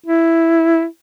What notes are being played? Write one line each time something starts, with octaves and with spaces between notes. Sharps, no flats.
E4